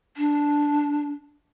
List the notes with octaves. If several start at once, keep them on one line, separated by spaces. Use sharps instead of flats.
D4